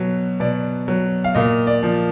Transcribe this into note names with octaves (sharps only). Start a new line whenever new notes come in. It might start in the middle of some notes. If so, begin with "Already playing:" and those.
Already playing: B2 F#3
B2 D5
F#3
F5
A#2 D#5
D5
F3